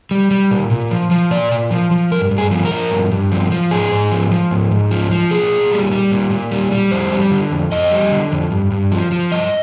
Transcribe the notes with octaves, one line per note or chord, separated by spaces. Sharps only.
G3
G3
A#2
A#2
F3
F3
A#2 D5
A#2
F3
F3
G2 A#4
G2
G#4
F3
A#4
F3
G2
G2
F3
F3
G#2 G#4
G#2
F3
F3
G#2
G#2
F3
F3
A#2 G#4
A#2
G3
G3
A#2
A#2
G3
G3
F2 C5
G3
D3
F2
F2 D#5
G3
D3
F2
G2
G2
F3
F3
G2 D#5